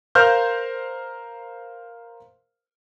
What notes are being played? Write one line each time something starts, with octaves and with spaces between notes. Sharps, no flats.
A#4 C5 F5 F6 G6